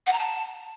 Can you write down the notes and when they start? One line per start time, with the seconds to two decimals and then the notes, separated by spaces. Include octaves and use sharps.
0.07 F#5
0.13 A#5
0.19 A5